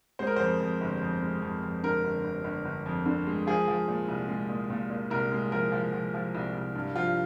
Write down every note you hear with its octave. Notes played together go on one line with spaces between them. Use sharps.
G#3 C5
A#4
F2 C5
F2
G1
F2
G#3
F2
F2
D3 A#4
G1
G1
G1
G1
F2
D3
G#3
F3 G#4
F3
A#2
C2
G#3
A#2
A#2
A#2
C2 A#4
G#3
F3 A#4
F3
F3
F3
C2
C2
G2
F3 F4